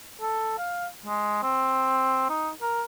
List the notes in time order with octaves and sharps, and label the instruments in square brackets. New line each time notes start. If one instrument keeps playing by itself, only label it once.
[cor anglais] A4
F5
G#3
C4
D#4
A#4